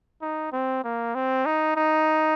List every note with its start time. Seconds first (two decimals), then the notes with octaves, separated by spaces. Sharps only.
0.22 D#4
0.53 C4
0.84 A#3
1.15 C4
1.46 D#4
1.76 D#4